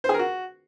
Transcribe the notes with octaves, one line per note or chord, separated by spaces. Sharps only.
C5
G#4
A#4
F#4